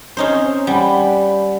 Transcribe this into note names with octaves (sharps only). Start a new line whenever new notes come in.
C4 C#4 D#4 C5 C#5
G3 F#5 G#5 B5